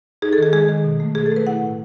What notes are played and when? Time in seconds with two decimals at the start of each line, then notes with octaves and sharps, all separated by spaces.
0.22 D#4 G#4
0.33 A4
0.38 D#3 G#4
0.53 G#3 G#4
0.68 D#3
0.84 B2
1.00 A3
1.15 B2 G#4
1.26 A4
1.32 A3 B4
1.47 E4 F#5
1.63 A2